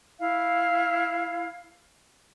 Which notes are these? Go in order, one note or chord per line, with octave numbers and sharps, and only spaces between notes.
E4 F5